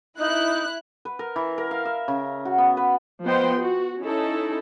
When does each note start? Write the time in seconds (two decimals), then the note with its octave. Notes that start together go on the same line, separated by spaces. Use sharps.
0.18 D#4 E4 F#6
1.05 B4
1.19 A#4
1.36 E3
1.58 A#4
1.71 F5
1.85 E5
2.08 C#3
2.45 F#4
2.58 B3
2.77 B4
3.24 F3 B3 C5 D#5 G5 C6
3.58 F#4
4.01 C#4 D#4 E4 A4